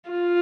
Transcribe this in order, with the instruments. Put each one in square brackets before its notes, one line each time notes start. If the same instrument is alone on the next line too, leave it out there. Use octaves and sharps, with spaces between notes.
[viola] F4